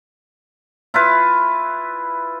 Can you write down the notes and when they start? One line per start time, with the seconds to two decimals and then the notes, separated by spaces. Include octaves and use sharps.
0.94 E4 F4 B4